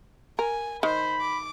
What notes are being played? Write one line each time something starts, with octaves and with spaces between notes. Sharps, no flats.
A#4 G#5
D#3 C5 B5
D6